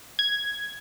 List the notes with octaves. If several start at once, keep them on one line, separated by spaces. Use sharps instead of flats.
G#6